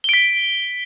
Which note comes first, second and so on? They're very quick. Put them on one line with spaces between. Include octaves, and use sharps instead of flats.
G7 D7 B6